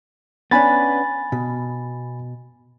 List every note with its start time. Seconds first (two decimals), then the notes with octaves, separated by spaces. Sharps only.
0.51 B3 C#4 D4 G#5 B5 A6
1.32 B2